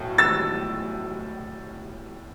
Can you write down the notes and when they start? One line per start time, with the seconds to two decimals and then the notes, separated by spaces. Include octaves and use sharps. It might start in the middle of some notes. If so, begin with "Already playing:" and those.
Already playing: B1 A2
0.18 E6 A6